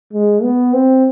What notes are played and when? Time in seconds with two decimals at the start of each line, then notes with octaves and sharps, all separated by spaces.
0.13 G#3
0.43 B3
0.74 C4